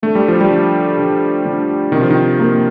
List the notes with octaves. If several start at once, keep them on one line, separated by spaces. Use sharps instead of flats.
D3 A3
G3
F3
G3
D3
D3
D3
C3 D#3
F3
D#3
A#3